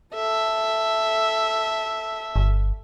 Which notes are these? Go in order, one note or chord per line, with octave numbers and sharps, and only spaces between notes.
A4 E5
G1